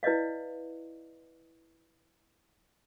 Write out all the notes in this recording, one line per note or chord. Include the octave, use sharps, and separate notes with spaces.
E4 B4 D5 D#5 F5